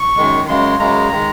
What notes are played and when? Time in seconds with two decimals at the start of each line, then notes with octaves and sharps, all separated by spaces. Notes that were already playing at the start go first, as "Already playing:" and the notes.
Already playing: C#6
0.17 F#2 D#3 G#3
0.48 F#2 C#3 G#3 C6
0.79 F#2 C#3 G#3 A#5
1.11 D#3 G#3